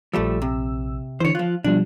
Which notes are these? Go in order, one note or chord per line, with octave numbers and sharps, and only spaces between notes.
A#1 F3 G3 A3 E6
C3
D3 E3 C5 C#5
F3 F4 F#6
B2 F3 G3 D4